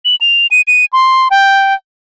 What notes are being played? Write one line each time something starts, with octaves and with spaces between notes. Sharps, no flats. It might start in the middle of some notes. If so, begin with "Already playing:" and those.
F#7
F7
D#7
D#7
C6
G5